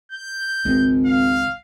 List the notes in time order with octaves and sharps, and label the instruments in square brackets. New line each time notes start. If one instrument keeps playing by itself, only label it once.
[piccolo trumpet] G6
[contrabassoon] G#1 [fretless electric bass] C#2 G#3
[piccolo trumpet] F5